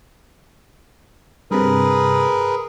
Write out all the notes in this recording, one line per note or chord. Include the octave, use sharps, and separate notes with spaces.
G2 C3 G#4 A#4 B4